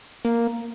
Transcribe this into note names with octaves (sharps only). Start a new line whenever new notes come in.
A#3